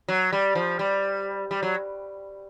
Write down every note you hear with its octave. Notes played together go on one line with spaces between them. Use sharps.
F#3
G3
F3
G3
G3
F#3